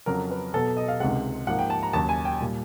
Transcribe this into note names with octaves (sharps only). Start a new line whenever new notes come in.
F2 C#3 F#3 A#4
B4
B2 F#3 B3 A4
D#5
F5
C#2 C3 D#3 G#3 F#5
G#2 F3 A#3 F#5
G5
A5
A#5
D#2 C#3 F#3 A5
G#5
G5
A#2 G3